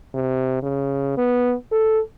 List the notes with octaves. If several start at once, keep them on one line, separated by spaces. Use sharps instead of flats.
C3
C#3
B3
A4